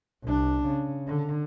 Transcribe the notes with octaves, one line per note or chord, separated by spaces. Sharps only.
C2 D4
C#3
D3